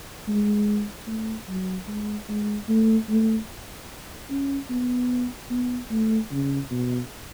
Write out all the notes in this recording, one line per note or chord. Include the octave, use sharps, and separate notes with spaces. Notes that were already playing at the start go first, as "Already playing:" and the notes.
G#3
A3
F#3
G#3
G#3
A3
A3
C#4
B3
B3
A3
C#3
B2